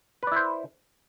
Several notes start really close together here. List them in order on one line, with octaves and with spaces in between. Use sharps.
B4 D5 E4 C5